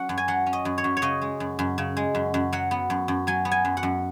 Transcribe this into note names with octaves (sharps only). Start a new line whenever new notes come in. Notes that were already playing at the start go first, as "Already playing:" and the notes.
Already playing: F#3 C#4 F#5
F#2
G#5
F#3 F#5
C#4
D#5
F#2
C#5
F#2
C#5
C#3 D#5
G#3
F#2
F#2
C#3
G#3
F#2
F#2
F#3 F#5
B3
F#2
F#2
F#3 G#5
B3
G#5
F#2
F#5
F#2